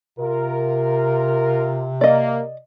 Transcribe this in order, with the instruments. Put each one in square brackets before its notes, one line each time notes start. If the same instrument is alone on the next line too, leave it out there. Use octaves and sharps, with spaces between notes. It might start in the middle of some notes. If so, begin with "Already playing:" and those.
[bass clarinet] C3 [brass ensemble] F4 A#4
[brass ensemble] A#3 [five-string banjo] D5 D#5